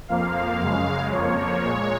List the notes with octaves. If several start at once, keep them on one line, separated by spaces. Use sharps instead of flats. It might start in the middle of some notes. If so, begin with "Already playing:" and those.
F2 F3 A#3 F5
F#2 C#3 G#3
F2 F3 A#3 C#5
A#2 G#3